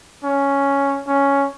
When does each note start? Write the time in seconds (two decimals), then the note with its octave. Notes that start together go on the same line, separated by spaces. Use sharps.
0.24 C#4
1.08 C#4